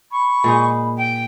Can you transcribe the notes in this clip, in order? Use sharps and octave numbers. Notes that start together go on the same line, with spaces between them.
B5 C#6
A#2 G#3 D#4
G5